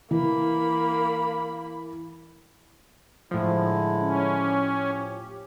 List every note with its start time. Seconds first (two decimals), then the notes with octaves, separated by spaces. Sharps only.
0.11 E3 A#3 B5
3.31 A2 D3 F3 G#3 E4
4.00 C#4
4.39 G4